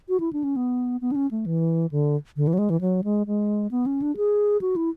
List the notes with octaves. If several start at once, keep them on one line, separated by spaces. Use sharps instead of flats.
F#4
E4
D4
C#4
B3
B3
D4
C#4
A3
E3
D3
D3
E3
F#3
G#3
E3
F#3
G#3
G#3
B3
C#4
D4
G#4
F#4
E4